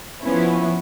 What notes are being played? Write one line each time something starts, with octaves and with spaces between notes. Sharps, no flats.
F3 B3 C#4 E4